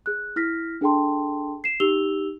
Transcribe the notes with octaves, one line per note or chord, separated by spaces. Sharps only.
G#4 F#6
E4 F6 A#6 B6
D4 G#4 A4 G5 A5 C6
C7 E7
D#4 G4 E6 F7 G7